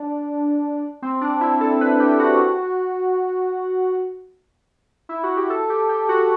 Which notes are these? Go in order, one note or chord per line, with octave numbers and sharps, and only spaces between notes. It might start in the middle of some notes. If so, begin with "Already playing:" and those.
Already playing: D4
C4
D4
E4
A4
B4
G4
F#4
E4
F#4
G4
A4
G4
G4
F#4